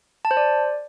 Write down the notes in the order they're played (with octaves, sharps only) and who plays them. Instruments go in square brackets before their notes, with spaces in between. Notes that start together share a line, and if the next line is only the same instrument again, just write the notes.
[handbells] A5
C5
D5